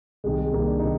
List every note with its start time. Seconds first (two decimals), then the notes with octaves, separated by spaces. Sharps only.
0.24 C2 C3 D#3 G#3
0.39 G#3
0.53 C2 C3 D#3 A#3
0.68 D4
0.79 C3 D#3 D#4